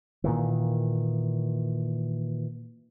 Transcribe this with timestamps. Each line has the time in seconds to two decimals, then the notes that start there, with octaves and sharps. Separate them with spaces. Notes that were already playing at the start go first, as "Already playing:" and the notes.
0.24 A#2 D#3 E3